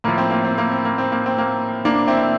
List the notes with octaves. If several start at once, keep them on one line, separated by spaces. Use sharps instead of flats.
A2 F3 A#3
C4
A#3
C4
A#3
C4
A#3
C4
A#3
C4
A#3
A#3 D4
C4 E4